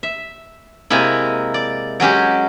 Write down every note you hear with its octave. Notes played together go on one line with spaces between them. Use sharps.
E5
C3 G#3 A#3 E4
D5
F#3 G#3 C#4 G4